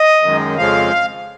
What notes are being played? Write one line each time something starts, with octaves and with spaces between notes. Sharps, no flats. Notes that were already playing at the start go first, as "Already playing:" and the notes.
Already playing: D#5
F#2 D#3 G#3
F2 C#3 F3 G#3 F5